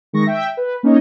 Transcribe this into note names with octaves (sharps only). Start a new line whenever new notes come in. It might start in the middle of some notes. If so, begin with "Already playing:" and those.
D#3 G#3 C#6 A#6
E5 G5
B4
A#3 C#4 D#4 C#5 D#5